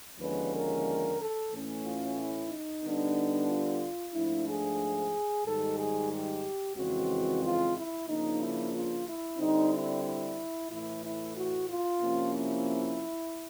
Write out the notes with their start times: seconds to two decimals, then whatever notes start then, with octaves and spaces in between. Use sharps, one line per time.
0.18 D#2 D3 F3 G#3 C#4 B4
0.53 A#4
1.18 A4
1.51 A2 E3 A3 C#4
1.83 F4
2.16 E4
2.48 D#4
2.82 D3 G3 B3 D4
3.47 F4
4.13 G#2 F3 A3 D4 E4
4.46 G#4
5.45 G#2 D#3 G3 A4
5.77 G#4
6.10 G4
6.75 F2 C#3 E3 G#3 C4 F#4
7.41 F4
7.74 E4
8.07 C#3 F3 A#3 D4 D#4
8.39 E4
8.72 F4
9.06 E4
9.37 D3 G3 C4 D#4
9.71 E4
10.03 E4
10.69 A2 E3 A3 E4
11.02 E4
11.34 F#4
11.67 F4
12.00 C3 F3 A#3 C#4
12.33 E4